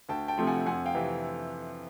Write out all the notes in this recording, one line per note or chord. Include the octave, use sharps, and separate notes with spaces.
D2 G5 A5
G5 A5
C3 F3 A3 C4
F#5 G#5
F2 F#5 G#5
F5 G5
C3 E3